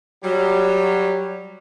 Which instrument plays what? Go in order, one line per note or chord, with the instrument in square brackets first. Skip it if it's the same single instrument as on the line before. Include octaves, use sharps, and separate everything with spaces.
[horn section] F#3 G3